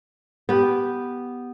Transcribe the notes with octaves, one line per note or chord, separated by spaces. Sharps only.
B3 G4